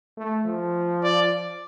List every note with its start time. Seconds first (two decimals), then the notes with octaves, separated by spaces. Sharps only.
0.17 A3
0.46 F3
1.04 D5